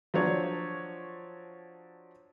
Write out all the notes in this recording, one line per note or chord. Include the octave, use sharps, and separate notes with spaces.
F3 F#3 D4 C#5